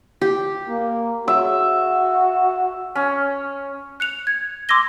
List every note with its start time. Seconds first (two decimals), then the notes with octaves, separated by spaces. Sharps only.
0.21 G4
0.67 A#3
1.28 F#4 E5
2.95 C#4
4.00 F#6 C#7 F7
4.27 G#6
4.69 C6 D6 E6 G#6 A#6 G7